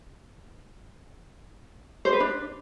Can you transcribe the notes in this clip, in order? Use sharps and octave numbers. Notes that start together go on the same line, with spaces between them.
C5
B4
D4